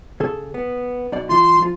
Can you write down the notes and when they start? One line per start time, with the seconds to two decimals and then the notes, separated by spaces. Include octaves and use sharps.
0.20 C#3 G#4 A4
0.54 B3
1.12 B1 B2 D5
1.29 E3 F4 C6
1.60 F3 F4